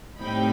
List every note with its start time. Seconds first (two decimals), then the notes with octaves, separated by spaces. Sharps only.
0.20 A2 G3 C4 D#4 G5 B5